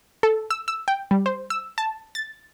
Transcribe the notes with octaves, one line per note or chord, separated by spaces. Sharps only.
A4
E6
E6
G5
G3
C5
E6
A5
A6